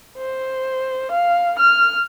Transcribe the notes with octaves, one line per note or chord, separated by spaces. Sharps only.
C5
F5
F6